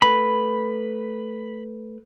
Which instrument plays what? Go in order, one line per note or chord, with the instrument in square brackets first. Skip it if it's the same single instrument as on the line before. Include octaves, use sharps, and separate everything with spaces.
[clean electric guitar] A3 B4 [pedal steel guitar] B5